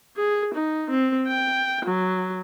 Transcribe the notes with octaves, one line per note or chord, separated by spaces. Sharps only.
G#4
D#4
C4
G5
F#3